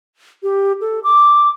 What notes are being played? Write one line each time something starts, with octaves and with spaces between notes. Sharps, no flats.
G4
A4
D6